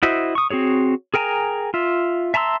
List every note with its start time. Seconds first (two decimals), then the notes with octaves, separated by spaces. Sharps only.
0.03 E4 F#4 C5 D#5 E5
0.35 C#6 D#6
0.50 C4 F#4 G#4 C#5
1.14 G#4 A#4 G5 G#5 A#5
1.74 F4 E5
2.34 E5 A5 A#5 C6 E6